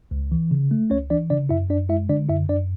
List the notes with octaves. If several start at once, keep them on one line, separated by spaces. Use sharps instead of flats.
C#2
E3
C#3
A3
C#2 C#4 C#5
E3 D4 D5
C#3 D4 D5
F#2 E4 E5
F#2 D4 D5
G#3 E4 E5
D3 D4 D5
F#2 E4 E5
F#2 D4 D5